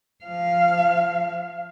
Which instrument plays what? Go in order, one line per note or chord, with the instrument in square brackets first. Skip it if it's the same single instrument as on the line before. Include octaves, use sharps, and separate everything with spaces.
[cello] F3 F5